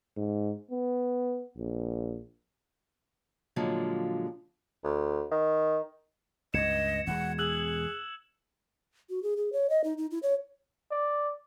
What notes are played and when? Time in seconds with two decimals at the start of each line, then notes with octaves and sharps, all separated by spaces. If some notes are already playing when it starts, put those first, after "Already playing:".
0.17 G#2
0.71 B3
1.57 A#1
3.56 A#2 D3 F3 F#3 G#3
4.84 D2
5.31 D#3
6.54 C#2 G2 D#5 G#6 C#7 E7
7.07 E2 B2 G#3 F#5
7.39 G#4 E6 F#6 F#7
9.10 F#4
9.23 G#4
9.37 G#4
9.53 C#5
9.70 D#5
9.84 D#4
9.98 D#4
10.11 E4
10.23 C#5
10.91 D5